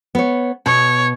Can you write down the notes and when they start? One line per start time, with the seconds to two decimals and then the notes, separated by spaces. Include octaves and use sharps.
0.15 B3 C#5
0.66 B2 C#5